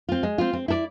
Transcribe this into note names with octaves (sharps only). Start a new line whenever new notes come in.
C4 F4
G#3
C4 F4
C4
E4 A4 D5